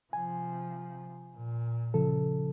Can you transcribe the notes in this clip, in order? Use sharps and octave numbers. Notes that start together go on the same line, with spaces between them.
C3 F3 G#5
A#2
C#3 F3 A4